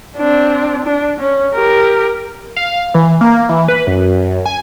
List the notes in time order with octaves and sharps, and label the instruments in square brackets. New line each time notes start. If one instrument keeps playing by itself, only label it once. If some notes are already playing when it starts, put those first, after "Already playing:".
[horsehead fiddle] C4 D4
D4
C#4
G4 A#4
[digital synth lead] F5
E3
A#3
E3
B4
F#2
G#5